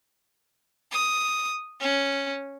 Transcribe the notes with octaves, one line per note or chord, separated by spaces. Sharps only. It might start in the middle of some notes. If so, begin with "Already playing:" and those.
D#6
C#4